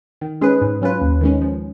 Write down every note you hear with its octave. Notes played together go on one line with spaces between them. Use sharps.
D#3
G#3 C#4 G#4 B4
G#2
F#3 C#4 F4 B4
D#2
D#3 G#3 C#4
F3